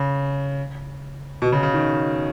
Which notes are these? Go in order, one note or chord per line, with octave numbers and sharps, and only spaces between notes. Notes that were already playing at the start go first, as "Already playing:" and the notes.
Already playing: C#3
B2
C#3
C#3
D#3